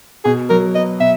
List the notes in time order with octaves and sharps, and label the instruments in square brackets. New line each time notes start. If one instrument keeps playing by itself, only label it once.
[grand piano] B2 [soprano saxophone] G#4
[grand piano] F#3 [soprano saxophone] A#4
[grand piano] B3 [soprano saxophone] D#5
[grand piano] B2 [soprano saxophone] E5